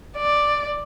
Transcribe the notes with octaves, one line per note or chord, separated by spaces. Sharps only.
D5